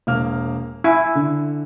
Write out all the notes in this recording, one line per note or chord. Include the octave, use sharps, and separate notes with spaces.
E1 A#3 F6
E4 G#5
D3